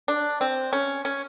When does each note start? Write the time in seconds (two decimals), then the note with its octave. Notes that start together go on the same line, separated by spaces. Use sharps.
0.08 D4
0.41 C4
0.73 C#4
1.05 C#4